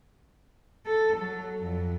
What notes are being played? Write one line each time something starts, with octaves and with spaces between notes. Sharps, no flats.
A4
F#3
F2